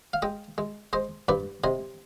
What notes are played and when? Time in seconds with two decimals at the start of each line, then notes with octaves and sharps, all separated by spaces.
0.13 F5
0.22 G#3 D#5 G5
0.58 G#3
0.93 G#3 C5 D#5
1.28 G2 B4 D5
1.64 C3 C5 D#5